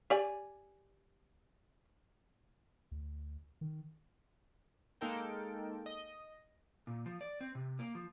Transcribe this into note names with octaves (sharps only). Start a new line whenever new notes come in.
G4 D5 G#5
D2
D#3
G#3 A#3 D#4 A4 A#4 G5
D#5
A#2
F3
D5
C4
C3
A#3
F3